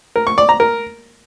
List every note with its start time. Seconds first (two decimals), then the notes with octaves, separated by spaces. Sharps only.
0.16 A#4
0.27 C#6
0.38 D5
0.49 A#5
0.60 A#4